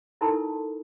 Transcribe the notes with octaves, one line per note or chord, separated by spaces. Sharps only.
D#4 E4 A4 A#4 A5 C6